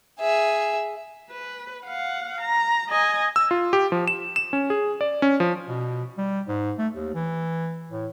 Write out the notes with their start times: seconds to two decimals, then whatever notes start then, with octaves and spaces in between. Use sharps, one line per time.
0.20 G#4 E5
1.30 B4
1.84 F5 F#5
2.41 A#5
2.89 D#5 G#5
3.36 E6
3.51 F4
3.73 G4
3.92 F3
4.08 E7
4.36 E7
4.53 C#4
4.70 G#4
5.01 D5
5.22 C#4
5.40 F3
5.68 B2
6.18 G3
6.48 G#2
6.78 A3
6.94 D#2
7.14 E3
7.90 A2